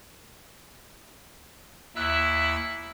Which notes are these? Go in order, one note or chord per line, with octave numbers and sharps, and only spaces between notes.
D#2 E4 E6 F#6